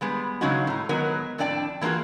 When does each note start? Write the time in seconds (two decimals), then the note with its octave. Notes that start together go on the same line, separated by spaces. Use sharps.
0.01 G3 G#3 B3
0.41 C#3 F#3 G#3 C#4 D#4 F#4
0.67 A2 A#5
0.89 D#3 F#3 G#3 B3 A#4
1.38 F2 A2 D4 D5 G5 A5
1.81 E3 A#3 F4 F#4 G#4